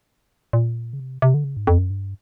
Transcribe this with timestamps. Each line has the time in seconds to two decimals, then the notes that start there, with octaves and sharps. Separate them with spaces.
0.53 A#2
0.93 C#3
1.00 C3
1.22 C3
1.34 D3
1.44 C#3
1.57 G#2
1.67 F2
1.78 F#2
1.90 G2